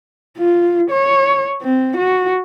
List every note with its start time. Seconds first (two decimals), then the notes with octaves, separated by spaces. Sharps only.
0.38 F4
0.90 C#5
1.62 C4
1.97 F#4